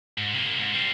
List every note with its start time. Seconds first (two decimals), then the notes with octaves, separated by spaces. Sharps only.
0.18 G#2
0.33 C3 A#3
0.58 G#2
0.73 G3 C4